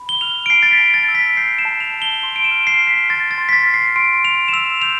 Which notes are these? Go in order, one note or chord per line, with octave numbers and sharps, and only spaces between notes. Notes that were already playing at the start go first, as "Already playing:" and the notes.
Already playing: B5
G7
F6 F7
D7
A5 C7
A6
B6
A5
A6
E6
B6
G6 C7
E7
A5
F7
A5
G7
C6
D7
E7
F6
C7
F6
B6
C6 A6
A6
C6
B6
A6
F6
C7
C6 D7
C6 F7
E7
E6 F7
G6 F7